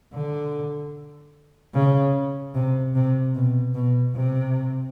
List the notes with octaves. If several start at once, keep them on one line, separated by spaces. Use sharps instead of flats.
D3
C#3
C3
C3
B2
B2
C3